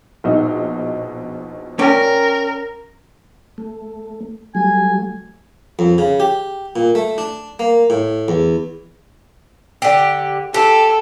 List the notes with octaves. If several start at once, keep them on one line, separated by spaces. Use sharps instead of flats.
A#1 B2 D#4
C#4 A#4 D5 G5
A3
F#3 G3 A3 G#5
F2
C#3
G4
A#2
A3
D4
A#3
A2
E2
D3 G4
G4 A4